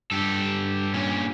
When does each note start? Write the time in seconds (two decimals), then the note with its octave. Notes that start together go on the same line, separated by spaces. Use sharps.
0.11 G2 G4 A4
0.94 A#2 C#4